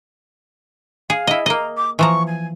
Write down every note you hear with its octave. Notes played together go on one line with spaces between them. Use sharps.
G#4 F5
E4 D#5
A#3 A#4 D#5
D6
E3 F3 A#5 C#6
G#5